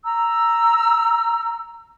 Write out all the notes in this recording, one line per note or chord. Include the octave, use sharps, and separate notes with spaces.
A#5 E6